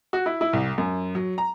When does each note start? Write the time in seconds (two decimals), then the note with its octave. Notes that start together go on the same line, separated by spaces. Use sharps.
0.13 F#4
0.26 E4
0.41 E4
0.53 C2
0.78 F#2
1.15 F#3
1.38 A#5